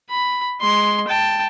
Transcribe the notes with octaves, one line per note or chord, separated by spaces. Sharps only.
B5
G#3 C6
G5 A5